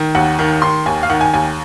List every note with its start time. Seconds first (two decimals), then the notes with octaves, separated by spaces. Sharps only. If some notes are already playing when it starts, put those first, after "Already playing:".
Already playing: D#3
0.15 D#2 F#5
0.39 D#3
0.62 D#3 C6
0.86 D#2 G#5
1.03 F5
1.10 D#3 F#5
1.21 G#5
1.34 D#2 G#5